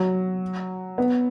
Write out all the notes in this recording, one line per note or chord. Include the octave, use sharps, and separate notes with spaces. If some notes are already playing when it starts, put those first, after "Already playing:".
Already playing: F#3
B3